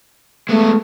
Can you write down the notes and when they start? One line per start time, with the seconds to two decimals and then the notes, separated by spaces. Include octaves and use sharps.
0.49 G#3 A3 B3